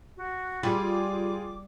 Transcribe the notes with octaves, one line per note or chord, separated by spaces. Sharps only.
F#4
G3 F4 G#4 G5 D6